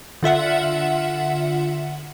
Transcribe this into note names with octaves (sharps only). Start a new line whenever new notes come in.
D3 F4 E5 F#5